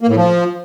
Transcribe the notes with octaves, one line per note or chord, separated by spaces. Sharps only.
A#3
A2
F3